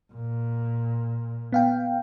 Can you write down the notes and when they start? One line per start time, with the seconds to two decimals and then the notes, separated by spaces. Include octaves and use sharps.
0.13 A#2
1.52 B3 F5 G5